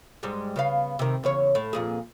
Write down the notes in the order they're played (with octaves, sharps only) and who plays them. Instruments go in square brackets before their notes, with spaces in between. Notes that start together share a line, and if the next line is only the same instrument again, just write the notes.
[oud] G#2 G3 G#3
C#3 B3 F5
C3 D#3
E2 C#3 C#5
A2
F2 A#2 G#4